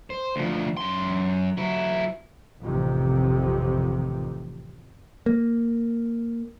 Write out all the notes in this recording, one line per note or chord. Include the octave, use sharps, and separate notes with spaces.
C5
D2 F3
F#2 C6
F#3 E4
A1 F2 C3 D#3
A#3